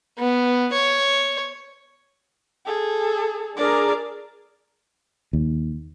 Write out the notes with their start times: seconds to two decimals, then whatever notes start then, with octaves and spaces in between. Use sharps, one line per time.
0.18 B3
0.73 C#5
2.66 G#4 A4
3.57 D4 G#4 A#4 D5
5.33 D#2